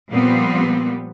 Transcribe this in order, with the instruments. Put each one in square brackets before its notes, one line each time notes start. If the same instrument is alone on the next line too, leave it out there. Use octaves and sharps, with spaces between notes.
[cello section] A#2 F3 G3 B3 C4